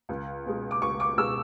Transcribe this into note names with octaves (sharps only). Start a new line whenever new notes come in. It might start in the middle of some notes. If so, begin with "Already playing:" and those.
C#2
B2 G#3
D6
C#2 C#6
D6
B2 G#3 E6